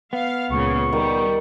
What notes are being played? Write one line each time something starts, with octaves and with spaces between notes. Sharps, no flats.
B3 F5
C#2 A#2 C#3 C#6
D#3 G3